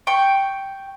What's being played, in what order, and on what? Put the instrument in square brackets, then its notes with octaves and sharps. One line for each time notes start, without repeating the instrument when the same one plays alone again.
[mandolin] G5 C#6